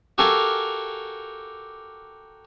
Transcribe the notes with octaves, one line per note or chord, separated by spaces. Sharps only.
F#4 G4 A4 A#4 F5 G#5